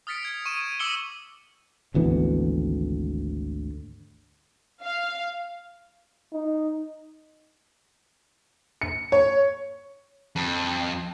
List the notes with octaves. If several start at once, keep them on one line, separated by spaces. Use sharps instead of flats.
D#6 F6 A6 B6 C#7 D7
G#6
C#6 D#7 E7
C#6 D6 E6 C#7 F#7 G7
G#1 D2 E3 B3
F5
D#4
C#7
C#5
F2